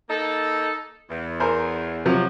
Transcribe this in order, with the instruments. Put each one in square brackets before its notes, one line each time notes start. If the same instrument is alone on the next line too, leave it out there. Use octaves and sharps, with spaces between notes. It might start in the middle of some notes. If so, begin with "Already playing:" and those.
[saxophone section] A#3 D#4 A4
E2
[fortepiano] A#4 C5 G#5
C3 F3 F#3